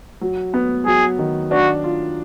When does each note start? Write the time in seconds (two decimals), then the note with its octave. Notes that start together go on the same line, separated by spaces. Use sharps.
0.21 F#3
0.54 B3
0.86 F#3 G#4
1.19 D#3
1.51 D4 F#4
1.84 F4